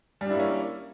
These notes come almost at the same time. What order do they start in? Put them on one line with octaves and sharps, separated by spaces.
G3 D4 E4 A#3 C#4